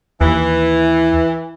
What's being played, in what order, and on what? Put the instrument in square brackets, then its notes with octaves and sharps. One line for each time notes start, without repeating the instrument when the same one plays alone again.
[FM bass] D#2 [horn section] E3